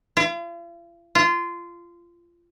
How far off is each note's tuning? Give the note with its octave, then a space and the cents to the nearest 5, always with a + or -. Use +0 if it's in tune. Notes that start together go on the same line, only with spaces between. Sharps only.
F4 -45
F4 -20